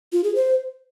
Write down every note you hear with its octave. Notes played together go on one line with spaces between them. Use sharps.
F4
G#4
C5